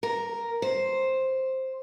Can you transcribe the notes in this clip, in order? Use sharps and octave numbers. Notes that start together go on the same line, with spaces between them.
A#4
C5